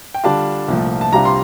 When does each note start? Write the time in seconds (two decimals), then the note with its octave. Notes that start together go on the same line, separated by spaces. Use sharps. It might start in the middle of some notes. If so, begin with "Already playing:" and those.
0.14 G5
0.24 D3 G3 D4 F4 A5
0.68 C2 A#2 F3 A3
1.01 A5
1.12 C2 C3 G3 D4 F4 A#5
1.25 C6